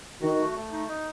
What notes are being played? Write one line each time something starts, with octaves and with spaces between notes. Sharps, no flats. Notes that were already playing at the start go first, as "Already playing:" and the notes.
D#3 F#4
A3
A3
D#4
D#4